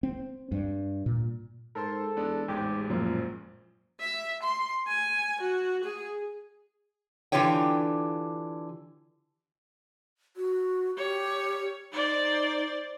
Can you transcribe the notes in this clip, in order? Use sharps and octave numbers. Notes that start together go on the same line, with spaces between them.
C4
G2
A#2
G#2 A4 A#4 C5 C6
E2 G#3 B3 D4
A1 E2 G#2 G#3 G4
F#2 A#2 F3
E5
C6
G#5
F#4
G#4
D3 E3 F4 G4 C#5 G5
F#4
G4 C#5
D#4 C5 D5